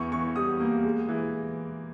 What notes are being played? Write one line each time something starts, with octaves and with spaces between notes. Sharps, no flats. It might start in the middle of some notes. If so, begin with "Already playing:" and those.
Already playing: E2 E3 C#6
E3 C#6
G3 D#6
A#3
G#3
E3